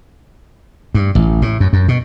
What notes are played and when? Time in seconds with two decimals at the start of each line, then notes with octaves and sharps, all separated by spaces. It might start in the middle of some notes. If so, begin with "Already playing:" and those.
0.95 G2
1.15 A1
1.42 A2
1.60 F#2
1.73 F#2
1.88 B2